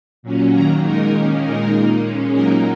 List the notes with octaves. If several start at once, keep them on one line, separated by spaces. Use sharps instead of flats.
A#2 F#3 C#4
D#3 F#3 A#3 A#5
A#2 G#3 D#4 A#4
D#3 A#3 C#4
A#2 G#3 D#4 A#4
A#2 A#3 D#4
A#2 G#3 C#4
A#2 F#3 A#3 D#4 A#4